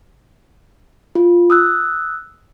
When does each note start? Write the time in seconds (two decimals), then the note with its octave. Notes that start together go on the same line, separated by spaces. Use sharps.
1.15 F4
1.50 D#6 E6 F#6